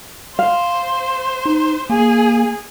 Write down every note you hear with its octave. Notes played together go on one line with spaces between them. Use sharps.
C5 F5
D#4
A#3 G#4 G#5